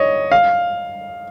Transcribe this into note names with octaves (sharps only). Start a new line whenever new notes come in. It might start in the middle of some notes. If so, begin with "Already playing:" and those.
Already playing: C#5 D#5
F5